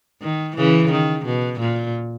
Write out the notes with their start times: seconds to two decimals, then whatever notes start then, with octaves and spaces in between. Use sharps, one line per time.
0.22 D#3
0.56 C#3 E3
0.91 D#3
1.25 B2
1.60 A#2